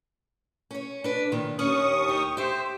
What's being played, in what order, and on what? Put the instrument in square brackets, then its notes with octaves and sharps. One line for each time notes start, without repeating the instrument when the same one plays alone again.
[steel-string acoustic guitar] C#4 C#5
D4 B4
A#2 D#3
[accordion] D#2 C#6 D#6 [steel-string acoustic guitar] C#4
[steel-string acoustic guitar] G4
[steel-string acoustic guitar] G4 E5 [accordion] C5